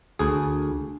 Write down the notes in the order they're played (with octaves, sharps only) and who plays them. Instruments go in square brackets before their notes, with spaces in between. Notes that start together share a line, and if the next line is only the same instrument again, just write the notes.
[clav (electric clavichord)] D2 G#4